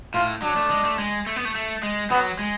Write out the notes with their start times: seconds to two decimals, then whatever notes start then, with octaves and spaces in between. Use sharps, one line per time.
0.14 A2 F4
0.42 F#3 D4
0.57 A3
0.70 G#3
0.85 A3
0.99 G#3
1.27 A3
1.36 B3
1.45 A3
1.55 A3
1.83 G#3
2.11 F#3 B3
2.39 G#3